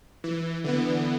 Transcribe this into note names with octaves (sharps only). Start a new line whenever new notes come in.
E3
D3 E3 B3